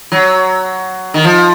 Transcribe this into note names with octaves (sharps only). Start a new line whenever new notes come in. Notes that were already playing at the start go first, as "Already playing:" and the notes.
F#3
D#3
F3